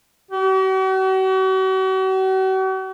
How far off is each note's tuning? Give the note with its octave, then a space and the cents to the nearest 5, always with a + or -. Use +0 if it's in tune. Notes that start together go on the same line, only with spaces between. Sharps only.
F#4 +45